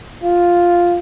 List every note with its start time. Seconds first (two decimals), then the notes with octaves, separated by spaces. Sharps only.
0.22 F4